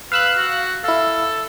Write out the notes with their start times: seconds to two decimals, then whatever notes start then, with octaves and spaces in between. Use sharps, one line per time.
0.12 B4 F5 E6 F#6
0.37 F#4
0.84 E4 A4 F5